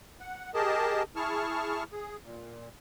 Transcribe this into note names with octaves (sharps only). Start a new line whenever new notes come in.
F#5
G4 G#4 A#4 D#5 A5
E4 G#4 A5 C#6 F6
G#4
A#2